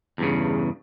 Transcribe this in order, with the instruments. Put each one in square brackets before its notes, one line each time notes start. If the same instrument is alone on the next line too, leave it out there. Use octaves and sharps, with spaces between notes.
[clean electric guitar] E2 G2 C#3